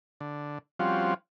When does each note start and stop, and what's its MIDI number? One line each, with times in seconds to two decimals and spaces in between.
0.21 0.58 50
0.79 1.14 53
0.79 1.14 55
0.79 1.14 60
0.79 1.14 61
0.79 1.14 65
0.79 1.14 66